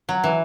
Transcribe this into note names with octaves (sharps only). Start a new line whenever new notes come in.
F#3
E3